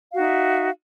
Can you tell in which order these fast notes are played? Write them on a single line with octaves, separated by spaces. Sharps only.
F5 F#4 D#4 E5